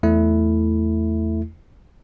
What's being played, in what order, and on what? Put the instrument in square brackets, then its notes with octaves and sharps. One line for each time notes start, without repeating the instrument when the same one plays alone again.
[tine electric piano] E2 A3 E4